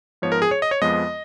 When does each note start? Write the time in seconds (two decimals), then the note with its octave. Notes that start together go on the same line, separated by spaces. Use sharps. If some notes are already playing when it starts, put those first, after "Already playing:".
0.22 G#2 F3 B3 C#5
0.32 A#4
0.42 G#4
0.51 C#5
0.62 D#5
0.71 C#5
0.82 F2 F3 G#3 B3 D#5